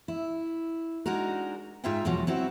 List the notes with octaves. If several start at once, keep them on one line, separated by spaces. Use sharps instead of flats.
E4
G#3 D4 D#4 F#4 A#4
G#2 D#4 F4 G#4 E5 G5
E2 G#2 B2 F3 F#3
F#3 C4 E4 F#4